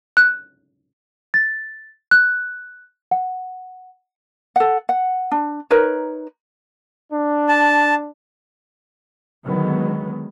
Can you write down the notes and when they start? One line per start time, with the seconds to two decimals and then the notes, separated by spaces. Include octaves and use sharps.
0.17 F#6
1.34 A6
2.11 F#6
3.11 F#5
4.56 A4 F#5
4.89 F#5
5.31 D4
5.70 D#4 A#4 B4 C#5
7.11 D4
7.49 A5
9.46 D3 D#3 F#3 G#3 B3